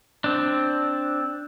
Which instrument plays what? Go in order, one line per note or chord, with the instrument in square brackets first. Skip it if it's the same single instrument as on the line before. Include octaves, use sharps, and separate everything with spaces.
[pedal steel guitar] C4 D4